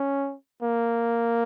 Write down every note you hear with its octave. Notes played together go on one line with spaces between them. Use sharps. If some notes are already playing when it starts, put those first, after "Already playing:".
Already playing: C#4
A#3